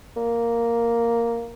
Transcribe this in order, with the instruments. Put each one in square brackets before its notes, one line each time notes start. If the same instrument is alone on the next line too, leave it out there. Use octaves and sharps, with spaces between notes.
[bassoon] A#3